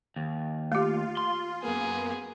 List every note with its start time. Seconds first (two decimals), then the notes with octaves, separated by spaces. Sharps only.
0.16 D#2
0.72 A3 F4 G4
1.17 C6
1.63 F#2 A#3 B3 G#4